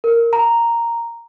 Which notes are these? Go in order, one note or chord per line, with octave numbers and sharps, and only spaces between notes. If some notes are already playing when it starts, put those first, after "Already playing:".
A#4
A#5